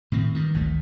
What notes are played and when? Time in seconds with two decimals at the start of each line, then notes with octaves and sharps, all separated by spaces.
0.12 A2 D#3 C4
0.35 G2 D#3
0.54 G#1 D2 D#3 A3